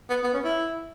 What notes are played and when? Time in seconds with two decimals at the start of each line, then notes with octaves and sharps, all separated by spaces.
0.09 B3
0.24 B3
0.34 C#4
0.44 E4